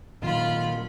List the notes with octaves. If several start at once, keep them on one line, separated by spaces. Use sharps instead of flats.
A#2 D#3 F#3 F4 B5